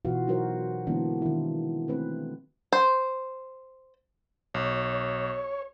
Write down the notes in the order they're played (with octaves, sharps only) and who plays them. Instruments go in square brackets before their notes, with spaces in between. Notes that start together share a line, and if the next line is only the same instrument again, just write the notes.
[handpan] B2 E3 F4 F#4 B4 F5
F#3 D#4 F#4 A#4 C5
D3 E3 G#3 A#3 B3 D4
D#3 E4
A3 C4 B4
[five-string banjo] C5
[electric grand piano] B1 [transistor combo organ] C#5